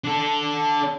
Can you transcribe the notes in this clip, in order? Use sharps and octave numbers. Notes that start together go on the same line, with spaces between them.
D4 A4